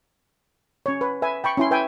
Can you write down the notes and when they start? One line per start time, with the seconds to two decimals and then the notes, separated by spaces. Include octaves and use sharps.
0.86 C#4 C#5
1.01 B4
1.22 B4 E5 G#5
1.44 G5 B5 C#6
1.57 C#4 E4 C6
1.71 B4 E5 G5 G#5